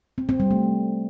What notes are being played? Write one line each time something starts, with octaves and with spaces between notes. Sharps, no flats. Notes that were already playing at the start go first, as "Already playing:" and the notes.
C4
C4
G3
A3